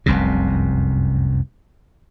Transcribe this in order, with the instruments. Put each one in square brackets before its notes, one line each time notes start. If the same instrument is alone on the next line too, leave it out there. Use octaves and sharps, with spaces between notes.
[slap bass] F1 C2 F#2 C3